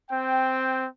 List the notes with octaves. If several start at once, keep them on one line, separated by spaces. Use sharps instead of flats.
C4 G5